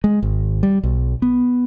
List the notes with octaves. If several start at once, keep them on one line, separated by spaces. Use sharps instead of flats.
G#3
G#1
G3
B1
B3